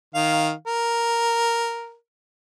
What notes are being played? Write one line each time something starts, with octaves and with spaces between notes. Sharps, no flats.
D#3 F5
A#4